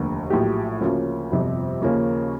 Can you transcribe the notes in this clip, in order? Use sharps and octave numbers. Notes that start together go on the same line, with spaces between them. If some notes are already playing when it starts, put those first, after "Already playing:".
Already playing: F1 D#2 D3
A#1 A2 F#3 G4
D2 C#3 F3 A#3 C#4
G1 F2 C3 F3
D#2 C#3 F3 A#3 C#4